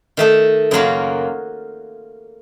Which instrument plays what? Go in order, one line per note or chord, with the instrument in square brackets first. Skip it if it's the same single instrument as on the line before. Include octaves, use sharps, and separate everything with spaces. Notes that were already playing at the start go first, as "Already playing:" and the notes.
[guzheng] D#3 A3 D#4 A4
F#2 C#3 F#3 A#3 F4